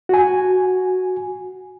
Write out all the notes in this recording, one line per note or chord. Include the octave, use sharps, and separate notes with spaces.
F#4 G#5